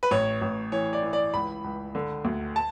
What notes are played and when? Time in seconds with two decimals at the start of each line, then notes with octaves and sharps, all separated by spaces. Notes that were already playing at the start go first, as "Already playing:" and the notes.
0.03 B4
0.11 A1 C#5
0.41 A1
0.72 E3 C#5
0.93 D5
1.03 E3
1.13 D5
1.34 C#2 B5
1.64 C#2
1.95 D3
2.25 D2
2.56 A5